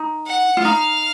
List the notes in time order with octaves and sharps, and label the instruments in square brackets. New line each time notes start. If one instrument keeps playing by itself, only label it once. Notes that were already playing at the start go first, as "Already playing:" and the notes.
Already playing: [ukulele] D#4
[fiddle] F#5
[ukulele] F4
[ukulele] D#4 [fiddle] F5